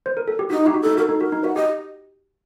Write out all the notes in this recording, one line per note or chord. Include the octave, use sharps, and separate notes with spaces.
C5
A#4
A4
G4
D#4 F#4
D#4 G4
F#4
D#4 A4
F#4 A#4
A4
D#4
F#4 A#4
D#4
F#4 F#5
G4 D#5